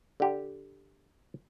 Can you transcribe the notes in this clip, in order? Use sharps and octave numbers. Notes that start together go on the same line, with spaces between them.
D3 G4